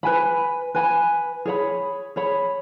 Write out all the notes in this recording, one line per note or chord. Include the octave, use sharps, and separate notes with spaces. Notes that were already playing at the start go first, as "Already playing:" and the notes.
B4 G#5 B5
B4 G#5 B5
G#4 C#5 B5
G#4 C#5 B5